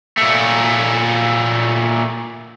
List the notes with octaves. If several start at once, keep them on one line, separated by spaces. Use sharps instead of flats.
A#2 A3